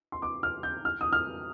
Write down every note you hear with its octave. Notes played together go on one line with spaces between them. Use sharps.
C6
D6
F6
G6
F6
D#6
F6